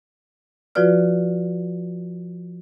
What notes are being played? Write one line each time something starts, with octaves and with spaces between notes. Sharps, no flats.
F3 F4 F#4 B4 D5 F6